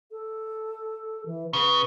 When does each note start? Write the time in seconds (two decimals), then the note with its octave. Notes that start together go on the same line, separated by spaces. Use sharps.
0.11 A4
1.26 E3
1.53 C#3 B4